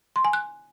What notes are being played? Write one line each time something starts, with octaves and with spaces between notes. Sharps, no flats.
C6
G#5
F#6